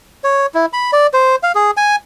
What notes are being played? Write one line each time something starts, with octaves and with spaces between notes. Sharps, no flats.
C#5
E4
B5
D5
C5
F5
G#4
G#5